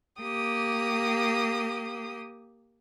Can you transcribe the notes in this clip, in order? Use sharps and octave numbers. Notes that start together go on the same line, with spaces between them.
A#3 G4 D#6